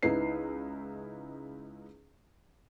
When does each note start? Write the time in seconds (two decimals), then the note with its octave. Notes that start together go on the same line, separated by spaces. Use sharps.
0.03 C#2 D#4 E4 B4 C7